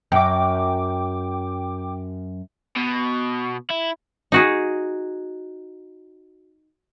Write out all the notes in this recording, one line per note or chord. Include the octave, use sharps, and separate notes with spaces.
F#2 G5 D6
B2
E4
D#4 F#4 G#4